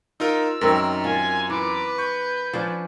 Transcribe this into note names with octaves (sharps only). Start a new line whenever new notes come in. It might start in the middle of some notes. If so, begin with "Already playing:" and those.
D#4 F4 A#4 E6
F#2 D#3 C4 A#4
F4 G#5
E3 B4 D6
C#6 G6
F3 C#4 D4